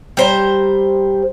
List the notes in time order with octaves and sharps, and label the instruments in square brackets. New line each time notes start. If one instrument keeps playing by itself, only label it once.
[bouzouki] G3 C5 A#5